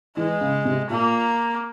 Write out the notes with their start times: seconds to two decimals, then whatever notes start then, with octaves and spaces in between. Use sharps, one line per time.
0.17 E3 G#3
0.41 C#3
0.65 C3
0.90 A#2 A#3